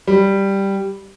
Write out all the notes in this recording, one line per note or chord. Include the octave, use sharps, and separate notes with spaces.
G3